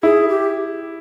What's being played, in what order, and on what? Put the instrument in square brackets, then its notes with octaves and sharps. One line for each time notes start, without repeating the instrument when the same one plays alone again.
[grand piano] E4 [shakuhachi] G#4
[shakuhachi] G4